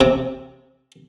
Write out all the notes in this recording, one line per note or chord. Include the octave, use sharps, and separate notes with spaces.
C3